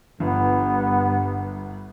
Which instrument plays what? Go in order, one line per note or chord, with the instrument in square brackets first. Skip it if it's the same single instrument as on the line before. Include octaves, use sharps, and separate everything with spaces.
[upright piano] G1 [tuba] G2 [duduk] B3